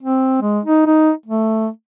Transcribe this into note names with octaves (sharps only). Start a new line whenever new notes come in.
C4
G#3
D#4
D#4
A3